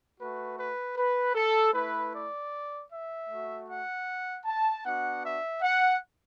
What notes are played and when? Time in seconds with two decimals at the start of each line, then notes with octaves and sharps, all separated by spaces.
0.18 A3 F#4 B4
0.57 B4
0.96 B4
1.35 A4
1.74 A3 E4 B4
2.13 D5
2.90 E5
3.29 A3 F#4
3.68 F#5
4.45 A5
4.84 B3 D4 F#4 F#5
5.24 E5
5.62 F#5